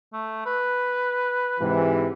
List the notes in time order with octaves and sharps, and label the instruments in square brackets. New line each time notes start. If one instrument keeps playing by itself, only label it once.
[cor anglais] A3
B4
[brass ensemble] G#2 C3 E3